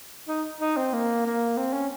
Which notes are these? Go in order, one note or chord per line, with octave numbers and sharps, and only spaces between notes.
D#4
D#4
C4
A#3
A#3
C4
C#4